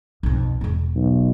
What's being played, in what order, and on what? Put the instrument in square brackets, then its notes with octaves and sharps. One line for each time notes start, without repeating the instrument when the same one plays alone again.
[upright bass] B1 F2
E1 B3
[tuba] B1